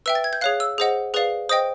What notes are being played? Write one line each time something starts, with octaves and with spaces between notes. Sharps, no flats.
B4 E5 G5 E6
A6
G#6
G6
G#4 C#5 F5 F#6
E6
G#4 C5 D#5 F#5
G#4 B4 D5 F5
C5 D#5 G5 D#6